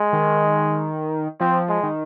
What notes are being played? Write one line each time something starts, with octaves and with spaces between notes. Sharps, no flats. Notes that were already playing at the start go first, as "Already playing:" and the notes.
Already playing: G#3
D#3
F3 C4
G#3
D#3